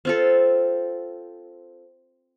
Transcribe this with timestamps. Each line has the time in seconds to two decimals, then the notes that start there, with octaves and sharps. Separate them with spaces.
0.05 C4 F4 A4